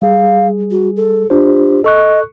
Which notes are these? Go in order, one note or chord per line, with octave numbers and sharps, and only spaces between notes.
G3 G#4 F5
F#4
A4
D4 F4 G4 C5
A4 D#5 C#6 F#6